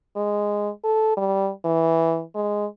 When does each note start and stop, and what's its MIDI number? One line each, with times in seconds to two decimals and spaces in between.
0.16 0.70 56
0.84 1.17 69
1.17 1.51 55
1.65 2.23 52
2.35 2.66 56